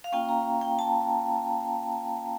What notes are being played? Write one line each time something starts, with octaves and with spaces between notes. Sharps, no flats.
F5
A#3 C#4 F4 G5
A#5
G5
A5